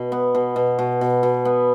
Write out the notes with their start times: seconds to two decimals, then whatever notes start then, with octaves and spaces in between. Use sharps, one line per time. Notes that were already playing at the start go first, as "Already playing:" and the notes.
Already playing: B2
0.12 B3
0.35 B2
0.56 B2
0.79 B2
1.01 B2
1.23 B2
1.45 B3